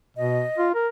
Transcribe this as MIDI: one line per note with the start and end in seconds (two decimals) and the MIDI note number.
0.17 0.43 47
0.17 0.67 75
0.58 0.70 65
0.74 0.88 70